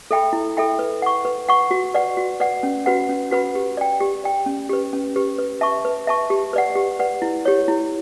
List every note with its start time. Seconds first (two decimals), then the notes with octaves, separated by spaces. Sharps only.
0.11 A4 E5 G5 B5
0.33 E4
0.57 A4 E5 G5 B5
0.79 B4
1.02 F#5 C#6
1.25 B4
1.49 F#5 C#6
1.71 F#4
1.94 B4 D5 F#5
2.17 F#4
2.40 B4 D5 F#5
2.63 C#4
2.86 F#4 B4 F#5 B5
3.09 C#4
3.31 F#4 B4 F#5 B5
3.55 G4
3.77 D5 G5
4.01 G4
4.24 D5 G5
4.46 C#4
4.69 G4 B4
4.93 C#4
5.16 G4 B4
5.38 B4
5.61 E5 A5 C#6
5.85 B4
6.07 E5 A5 C#6
6.30 G4
6.53 B4 D5 F#5
6.75 G4
6.99 B4 D5 F#5
7.22 E4
7.45 G4 C#5
7.68 E4